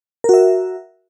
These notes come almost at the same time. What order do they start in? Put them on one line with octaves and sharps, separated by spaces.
A#4 F#4 E5